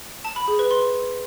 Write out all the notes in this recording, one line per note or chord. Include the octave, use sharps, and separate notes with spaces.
A5
B5
G#4
B4
C6